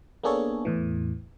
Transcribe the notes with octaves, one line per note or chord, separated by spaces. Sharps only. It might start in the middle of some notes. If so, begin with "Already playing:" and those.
A#3 B3 D4 G#4 A4 C#5
E2 A2 E3